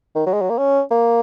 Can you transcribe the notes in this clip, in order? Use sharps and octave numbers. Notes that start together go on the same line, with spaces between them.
D#3
F#3
G#3
F#3
A#3
C#4
A#3